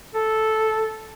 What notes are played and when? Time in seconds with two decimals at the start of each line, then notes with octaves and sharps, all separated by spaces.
0.14 A4